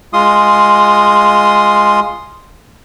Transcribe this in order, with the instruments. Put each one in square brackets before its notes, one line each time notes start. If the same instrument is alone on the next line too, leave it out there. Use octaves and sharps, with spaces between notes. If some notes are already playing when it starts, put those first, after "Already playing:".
[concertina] G#3 F4 C6 D#6